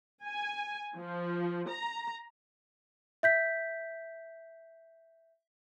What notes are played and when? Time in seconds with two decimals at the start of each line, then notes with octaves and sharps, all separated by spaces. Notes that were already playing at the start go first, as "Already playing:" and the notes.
0.25 G#5
0.98 F3
1.69 A#5
3.23 E5 G6 B6